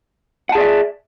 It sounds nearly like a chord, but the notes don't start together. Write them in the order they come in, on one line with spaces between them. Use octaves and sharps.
F#5 A5 G#4 D5 E5